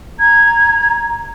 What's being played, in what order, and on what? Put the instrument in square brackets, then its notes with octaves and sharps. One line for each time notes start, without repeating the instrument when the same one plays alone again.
[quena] A#5 [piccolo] G#6